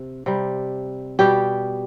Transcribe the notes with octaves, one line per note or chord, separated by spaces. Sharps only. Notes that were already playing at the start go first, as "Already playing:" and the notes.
Already playing: C3
C3 G3
B2 G3 G4